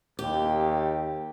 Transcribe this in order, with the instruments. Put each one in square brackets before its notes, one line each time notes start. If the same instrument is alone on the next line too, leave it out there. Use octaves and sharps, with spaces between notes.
[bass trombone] D#2 [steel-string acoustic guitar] G4